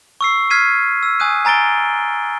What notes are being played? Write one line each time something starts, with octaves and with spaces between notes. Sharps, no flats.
C#6 E6 C7
F6 G#6 B6 C7 D#7
E6
G#5 D#6 F#6 D#7
G#5 A#5 A6 D7 G7